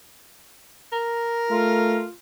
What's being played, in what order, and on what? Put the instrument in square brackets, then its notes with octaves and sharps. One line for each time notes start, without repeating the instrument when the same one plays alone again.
[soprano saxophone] A#4
[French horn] A3 [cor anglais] F4